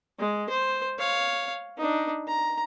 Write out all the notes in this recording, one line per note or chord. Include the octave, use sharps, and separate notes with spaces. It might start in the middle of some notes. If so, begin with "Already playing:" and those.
G#3
C5
C#5 F5
D4 D#4
A#5